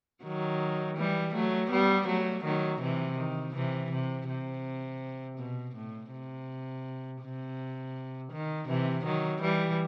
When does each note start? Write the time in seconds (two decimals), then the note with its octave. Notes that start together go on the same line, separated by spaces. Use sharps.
0.24 D#3 F#3
0.97 E3 G3
1.34 F#3 A3
1.70 G3 B3
2.07 F#3 A3
2.44 D#3 F#3
2.81 C3 E3
3.17 D#3
3.54 C3 E3
3.91 C3
4.28 C3
5.38 B2
5.75 A2
6.12 C3
7.22 C3
8.32 D#3
8.68 C3 E3
9.05 D#3 F#3
9.42 E3 G3